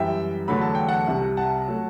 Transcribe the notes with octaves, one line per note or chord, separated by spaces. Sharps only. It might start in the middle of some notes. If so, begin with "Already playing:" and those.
Already playing: F#2 E3 G3 E5 G5
E2 D3 F#3 A3 B5
A5
G5
F#5 A5
C2 C3 G3
F#5 A5
F#3 A3